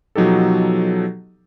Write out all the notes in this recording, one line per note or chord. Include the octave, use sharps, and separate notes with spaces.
B2 F3 F#3 D#4 G4 A4